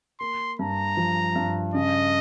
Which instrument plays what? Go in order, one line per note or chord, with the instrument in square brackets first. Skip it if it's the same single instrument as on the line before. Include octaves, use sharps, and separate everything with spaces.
[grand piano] A#3 [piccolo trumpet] C6
[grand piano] G2 [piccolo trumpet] A#5
[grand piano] F3
G2
[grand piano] C#3 [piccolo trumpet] D#5